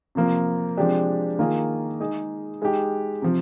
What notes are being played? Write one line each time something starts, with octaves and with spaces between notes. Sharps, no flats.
C3 F3 A#3
C3 F3 G#3 D4 G4
D#3 A#3 F4 G#4
G#3 D#4 G#4
G#3 D#4 G4
C3 F3